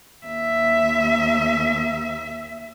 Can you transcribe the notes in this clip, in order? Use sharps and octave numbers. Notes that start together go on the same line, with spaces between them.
D#2 E5